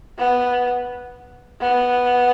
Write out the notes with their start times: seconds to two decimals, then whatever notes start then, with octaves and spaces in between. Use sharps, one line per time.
0.18 B3
1.61 B3